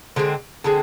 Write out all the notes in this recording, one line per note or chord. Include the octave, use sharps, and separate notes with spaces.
D3 G#3 C4
D3 G#3 C4